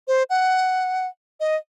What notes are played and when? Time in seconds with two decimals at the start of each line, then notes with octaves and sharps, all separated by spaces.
0.08 C5
0.30 F#5
1.40 D#5